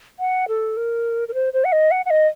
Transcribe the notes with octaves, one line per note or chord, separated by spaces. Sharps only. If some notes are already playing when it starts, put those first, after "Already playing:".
F#5
A4
A#4
A#4
C5
C5
F#5
D#5
F#5
F#5
D#5